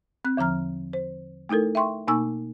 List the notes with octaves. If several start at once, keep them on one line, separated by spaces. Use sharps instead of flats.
C4 F#6
E2 D3 F3 A#5 F6
C5
A3 D#4 E4 A4 A#4
E5 G5 C6 C#6
B2 A#3 D#4 G#5 C#6 E6